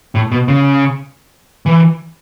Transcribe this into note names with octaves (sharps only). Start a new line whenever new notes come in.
A2
B2
C#3
E3